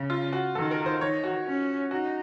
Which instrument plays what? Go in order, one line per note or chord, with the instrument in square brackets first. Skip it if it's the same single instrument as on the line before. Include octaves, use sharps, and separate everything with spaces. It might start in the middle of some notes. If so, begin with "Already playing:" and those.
Already playing: [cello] C#3
[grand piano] F4
F#4
[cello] D#3 [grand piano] A4
[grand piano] A#4
C5
[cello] D#3 [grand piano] C#5
[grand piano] F#4
[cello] C#4
[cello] D#4 [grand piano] F#4